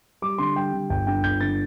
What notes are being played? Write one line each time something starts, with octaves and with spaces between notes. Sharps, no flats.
G3 D6
D3 C6
G3 G5
D3
G1 G5
D3 G5
G1 G6
D3 A6